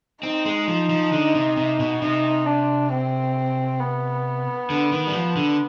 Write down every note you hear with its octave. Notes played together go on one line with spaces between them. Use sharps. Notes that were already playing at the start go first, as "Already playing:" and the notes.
C4 D#4
G#3
F3
F3
D3
C3
C3
B2
C3 D#4
D4
C4
B3
D3
D#3
G3
F3
D3